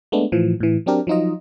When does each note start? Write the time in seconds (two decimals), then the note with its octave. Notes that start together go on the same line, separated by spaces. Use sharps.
0.12 G#3 A3 B3 D4
0.32 A2 E3 F3
0.60 A2 E3
0.86 F#3 C4 D4 G4 A#4
1.07 F3 F#3 D#4 F4 D#5